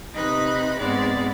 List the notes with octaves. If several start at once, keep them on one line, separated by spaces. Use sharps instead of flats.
C3 D#4 B4 D#5 B5 F#6
G#2 G#3 B3 C4 D5